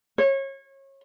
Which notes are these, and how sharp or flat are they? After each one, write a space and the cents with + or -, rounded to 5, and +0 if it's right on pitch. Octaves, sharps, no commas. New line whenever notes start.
C#5 -30